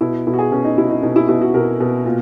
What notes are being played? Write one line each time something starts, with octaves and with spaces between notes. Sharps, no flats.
B2 E4
B2 E4
F#4
G#4
B2 C#4
D#4
B2 E4
D#4
B2 D#4
E4
B2 E4
F#4
B2 A#4
B2
A#2